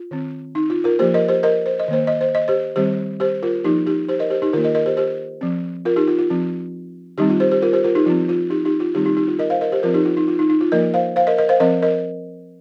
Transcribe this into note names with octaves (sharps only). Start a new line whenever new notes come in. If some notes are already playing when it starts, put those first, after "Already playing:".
Already playing: F4
D#3 C4
D#4
F4
F4 A#4
F3 A#3 G4 C5
A#4 D#5
G4 C5
A#4 D#5
C5
D#5
D#3 A#3 C5
D#5
C5
D#5
G4 C5
D#3 G3 C4 G4 C5
G4 C5
F4 A#4
F3 A#3 D#4 G4
D#4 G4
G4 C5
A#4 D#5
G4 C5
D#4 G4
D#3 A#3 F4 A#4
A#4 D#5
A#4 D#5
G4 C5
G4 C5
F3 C4
F4 A#4
D#4 G4
F4
F4
F3 C4
D#3 G3 C4 D#4 G4
F4
G4 C5
G4 C5
F4 A#4
G4 C5
F4 A#4
D#4 G4
F3 C4 F4
F4
D#4 G4
D#4 G4
F4
D#3 G3 C4 D#4 G4
D#4 G4
D#4 G4
F4
A#4 D#5
C5 F5
A#4 D#5
G4 C5
F3 C4 F4 A#4
D#4 G4
F4
D#4
F4
D#4
D#4
F4
F3 A#3 A#4 D#5
C5 F5
C5 F5
A#4 D#5
A#4 D#5
C5 F5
F3 C4 A#4 D#5
A#4 D#5